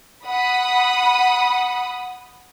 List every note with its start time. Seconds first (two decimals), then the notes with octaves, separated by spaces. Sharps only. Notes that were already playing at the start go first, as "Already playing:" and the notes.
0.25 F#5 B5 D#6